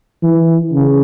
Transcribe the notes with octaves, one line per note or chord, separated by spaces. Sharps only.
E3
C#3